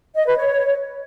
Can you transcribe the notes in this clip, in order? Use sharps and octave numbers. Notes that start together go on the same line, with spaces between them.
D#5
B4
C#5